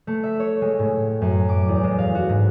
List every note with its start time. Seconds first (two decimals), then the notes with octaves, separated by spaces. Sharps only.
0.07 A3
0.24 E5
0.40 C#5
0.61 G#3
0.79 A2
1.22 F#2
1.49 D6
1.68 E2
1.84 G#3
1.98 F5
2.15 F#4
2.29 G#2